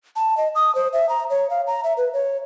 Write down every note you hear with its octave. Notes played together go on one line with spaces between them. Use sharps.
A5
D#5
D#6
C5
E5
A#5
C#5
F5
A#5
E5
B4
C#5